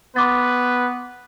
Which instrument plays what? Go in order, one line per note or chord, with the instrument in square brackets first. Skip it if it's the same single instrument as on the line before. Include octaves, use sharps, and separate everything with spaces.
[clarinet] B3 [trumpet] B4 [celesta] C6 D6 A6